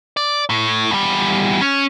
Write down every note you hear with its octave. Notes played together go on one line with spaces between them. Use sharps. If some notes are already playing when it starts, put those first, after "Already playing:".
D5
A2
E2 G3
C#4